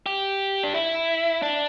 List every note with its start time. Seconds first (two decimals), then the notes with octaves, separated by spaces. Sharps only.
0.06 G4
0.63 D4
0.74 E4
1.42 D4